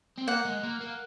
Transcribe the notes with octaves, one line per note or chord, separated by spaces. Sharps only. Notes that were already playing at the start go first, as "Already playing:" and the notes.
C4
A#3 F#5
G#3
A#3
A#3